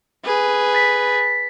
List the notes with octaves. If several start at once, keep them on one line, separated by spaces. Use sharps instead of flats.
G#4 B4
A6 B6